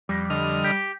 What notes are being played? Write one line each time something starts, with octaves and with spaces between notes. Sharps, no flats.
F2 G3
D3 D#5 F6
G4